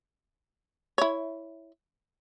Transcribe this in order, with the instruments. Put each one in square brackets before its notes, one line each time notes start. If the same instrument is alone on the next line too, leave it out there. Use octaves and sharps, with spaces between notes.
[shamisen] E4 C#5